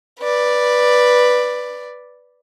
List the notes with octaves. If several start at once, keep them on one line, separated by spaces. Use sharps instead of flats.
B4 D5